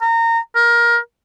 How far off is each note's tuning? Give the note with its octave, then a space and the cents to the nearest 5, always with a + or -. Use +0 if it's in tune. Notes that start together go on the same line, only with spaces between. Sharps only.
A#5 -25
A#4 +20